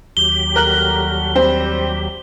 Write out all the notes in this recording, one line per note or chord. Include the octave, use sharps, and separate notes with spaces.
D#2 F#3 G4 G7
G3 F#4 A4 A#4 F#6 F#7
G3 C4 C5